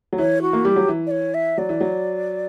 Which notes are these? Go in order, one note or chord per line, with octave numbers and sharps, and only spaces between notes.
F#3
E3 C#5
F#4
A#3
G3 G4
F#3
E3
D5
C#5
E5
F#3 D5
E3
F#3